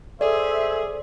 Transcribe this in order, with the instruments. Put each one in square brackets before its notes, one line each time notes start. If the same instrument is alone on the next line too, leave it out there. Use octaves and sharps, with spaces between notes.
[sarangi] G#4 [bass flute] A4 [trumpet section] C5 E5 [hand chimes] D5